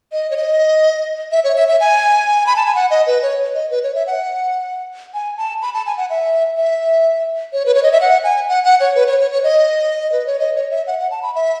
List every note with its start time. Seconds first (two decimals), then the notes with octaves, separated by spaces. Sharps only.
0.12 D#5
0.31 C#5
0.37 D#5
1.32 E5
1.44 C#5
1.56 E5
1.68 E5
1.80 G#5
2.46 B5
2.56 A5
2.65 G#5
2.75 F#5
2.91 D#5
3.07 B4
3.23 C#5
3.55 D#5
3.71 B4
3.83 C#5
3.95 E5
4.07 F#5
5.14 G#5
5.37 A5
5.62 B5
5.74 A5
5.86 G#5
5.97 F#5
6.10 E5
6.57 E5
7.53 C#5
7.66 B4
7.75 C#5
7.83 D#5
7.92 E5
8.01 F#5
8.24 G#5
8.49 F#5
8.64 F#5
8.80 C#5
8.95 B4
9.07 C#5
9.20 C#5
9.31 C#5
9.44 D#5
10.12 B4
10.26 C#5
10.39 D#5
10.56 C#5
10.71 E5
10.87 F#5
10.99 F#5
11.11 A5
11.23 B5
11.35 E5